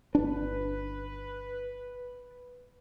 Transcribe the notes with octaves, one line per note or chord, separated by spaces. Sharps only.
G1 D4 B4